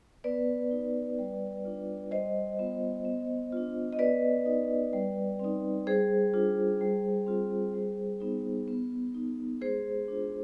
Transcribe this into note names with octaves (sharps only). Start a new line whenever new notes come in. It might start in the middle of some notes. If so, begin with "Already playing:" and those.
B3 B4 D5
D#4
G3
D4 F4
G3 C5 D#5
B3 F4
B3
D4 F4
D#5
B3 B4 D5
D#4
G3
C4 D#4
G3 G#4 C5
D4 F4
G3
C4 F4
G3
B3 D#4
B3
D#4
G#3 G#4 C5
D4 F4